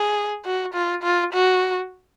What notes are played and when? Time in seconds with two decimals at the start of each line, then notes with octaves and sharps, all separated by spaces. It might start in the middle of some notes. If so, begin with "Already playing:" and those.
Already playing: G#4
0.45 F#4
0.74 F4
1.03 F4
1.33 F#4